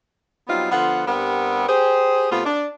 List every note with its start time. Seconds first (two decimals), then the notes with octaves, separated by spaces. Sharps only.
0.48 F#3 G3 B3 C4 D#4 F4
0.71 D3 F3 B3 F4 F#5
1.07 G2 G3 B3 C4 A#4 F#5
1.68 G4 G#4 C5
2.31 C3 A3 B3 F4
2.45 D4